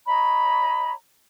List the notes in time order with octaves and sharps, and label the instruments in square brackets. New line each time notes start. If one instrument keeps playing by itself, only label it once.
[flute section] C#5 D#5 A#5 B5